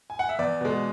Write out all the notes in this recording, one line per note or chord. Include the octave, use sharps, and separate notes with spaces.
G#5
F#5
E5
E2 D5
B2 G#3